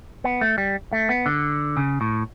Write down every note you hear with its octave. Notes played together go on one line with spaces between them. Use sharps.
B3
A3
G3
A3
B3
D3
C#3
A2